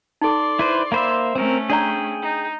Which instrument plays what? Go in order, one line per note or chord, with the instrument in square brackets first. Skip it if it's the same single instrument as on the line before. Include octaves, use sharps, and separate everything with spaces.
[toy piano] D#4 A4 [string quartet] D5 C6
[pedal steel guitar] E4 B4 C5
[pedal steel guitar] A#3 C5 E5 [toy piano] F5 B5
[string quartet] A3 C#4 [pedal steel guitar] C4 A#4 [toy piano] C5
[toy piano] D4 D5 A#5 [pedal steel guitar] G#4 G5
[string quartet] D#4